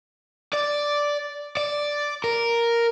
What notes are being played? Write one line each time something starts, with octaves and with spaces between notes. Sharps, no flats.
D5
D5
A#4